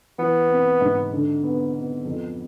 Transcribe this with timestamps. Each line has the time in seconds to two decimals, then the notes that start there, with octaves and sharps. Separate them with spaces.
0.18 E3 B3
0.50 C4
0.81 G#2
1.12 D3
1.43 B3
1.74 B3
2.05 F2